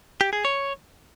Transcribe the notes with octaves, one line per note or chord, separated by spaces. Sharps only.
G4
G#4
C#5